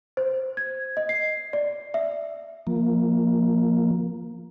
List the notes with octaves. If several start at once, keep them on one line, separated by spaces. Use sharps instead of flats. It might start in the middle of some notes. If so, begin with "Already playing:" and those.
C5
G#6
D#5
C7
D5
E5
F3 A#3